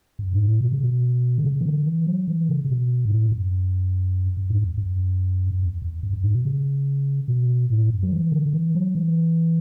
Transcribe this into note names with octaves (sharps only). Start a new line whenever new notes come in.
F#2
G#2
A2
B2
C#3
B2
D3
C#3
E3
D3
E3
F#3
E3
C#3
C#3
B2
G#2
A2
G#2
F#2
F#2
G#2
E2
F#2
F#2
E2
E2
F#2
F#2
G#2
B2
C#3
B2
A2
F#2
F#3
E3
D3
D3
E3
F#3
E3